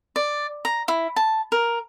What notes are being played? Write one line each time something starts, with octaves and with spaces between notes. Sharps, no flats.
D5
A#5
E4
A5
A#4